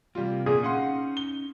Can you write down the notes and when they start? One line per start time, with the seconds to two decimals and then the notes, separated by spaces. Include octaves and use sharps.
0.15 C3 G3 A#3 F4
0.46 A#2 G#4
0.63 C#4 D#4 F5 F#5 C6
1.17 G7